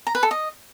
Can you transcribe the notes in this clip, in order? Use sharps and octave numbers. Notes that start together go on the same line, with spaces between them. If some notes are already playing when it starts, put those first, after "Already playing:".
A#5
B4
A4
D#5